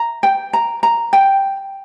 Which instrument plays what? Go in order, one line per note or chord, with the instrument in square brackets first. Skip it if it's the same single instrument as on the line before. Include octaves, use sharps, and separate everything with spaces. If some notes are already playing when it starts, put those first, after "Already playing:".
Already playing: [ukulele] A#5
G5
A#5
A#5
G5